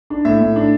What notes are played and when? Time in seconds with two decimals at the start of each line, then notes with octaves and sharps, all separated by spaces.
0.10 D4
0.25 A2 E5
0.41 A2
0.56 D4